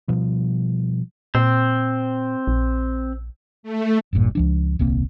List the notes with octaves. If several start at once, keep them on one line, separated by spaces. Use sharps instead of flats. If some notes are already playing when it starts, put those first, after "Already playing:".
B2 F3 G3
A#2 C4
A#1
A3
E1 A1 G2 A#2
C#2 F3 D4
D#1 C2 A#3 C4